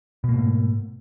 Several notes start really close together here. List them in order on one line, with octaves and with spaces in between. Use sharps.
B2 A#3 G#2 A3